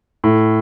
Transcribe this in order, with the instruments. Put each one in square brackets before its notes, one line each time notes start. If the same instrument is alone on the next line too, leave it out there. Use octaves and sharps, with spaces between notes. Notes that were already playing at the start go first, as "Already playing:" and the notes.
[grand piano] A2